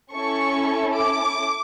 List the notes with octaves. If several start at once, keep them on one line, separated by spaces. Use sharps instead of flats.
C#4 E4 A4 C#6
D6